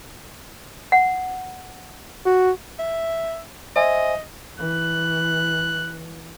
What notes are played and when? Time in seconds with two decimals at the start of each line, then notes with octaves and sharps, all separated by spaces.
0.92 F#5
2.26 F#4
2.79 E5
3.76 C5 D#5 E5 G#5
4.60 E3 F#6